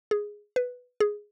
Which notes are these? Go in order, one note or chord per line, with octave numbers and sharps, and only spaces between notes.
G#4
B4
G#4